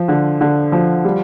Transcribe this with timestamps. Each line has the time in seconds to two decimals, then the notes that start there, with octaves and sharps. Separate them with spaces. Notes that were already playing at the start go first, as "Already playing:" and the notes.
Already playing: F3
0.08 D3
0.41 D3
0.72 F3
1.05 G3